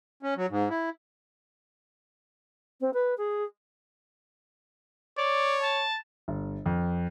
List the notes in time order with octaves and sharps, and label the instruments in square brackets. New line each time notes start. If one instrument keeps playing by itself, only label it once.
[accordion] C#4
F#3
G#2
E4
[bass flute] C4
B4
G#4
[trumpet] C#5 [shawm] D5
[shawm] A5
[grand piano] G1
F2